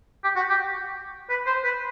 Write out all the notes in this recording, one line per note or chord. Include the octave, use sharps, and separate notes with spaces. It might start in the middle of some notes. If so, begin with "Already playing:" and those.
G4
F#4
G4
B4
C5
B4